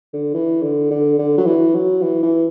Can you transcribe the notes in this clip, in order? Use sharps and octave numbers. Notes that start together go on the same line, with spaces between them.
D3
E3
D3
D3
D3
F#3
E3
F#3
E3
E3